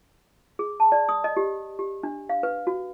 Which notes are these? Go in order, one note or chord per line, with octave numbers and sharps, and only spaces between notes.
G#4
A5
D5
D#6
D#5
G4
G4
D4
F5
B4
F#4